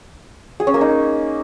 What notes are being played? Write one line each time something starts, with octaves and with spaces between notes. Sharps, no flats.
G#4
C#4
A#3
D#4